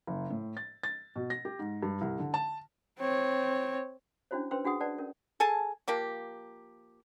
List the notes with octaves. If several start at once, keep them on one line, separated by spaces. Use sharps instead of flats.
F#1
A2
A6
A6
B2
A#6
G4
G#2
G2
C2
D3
A5
C4 C#5
C#4 D4 E4 F#4 C5 C#5
C#4 B4 C5 G5 C6 E6
D4 F#4 G#4 F#5 D#6
B4 C#5 D5 F#5 A5
C#4 A#4
G#4 A4 G#5 A5
F3 A#3 G4